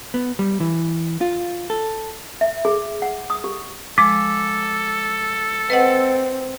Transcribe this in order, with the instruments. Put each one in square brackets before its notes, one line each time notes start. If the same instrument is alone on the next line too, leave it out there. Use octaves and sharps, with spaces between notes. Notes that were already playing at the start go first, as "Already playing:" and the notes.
[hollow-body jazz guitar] B3
G3
E3
F4
A4
[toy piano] E5
G#4
F#5
D#6
G4
[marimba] F3 G#3 [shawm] A4 [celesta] D6
[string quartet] C4 [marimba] B4 D#5 F#5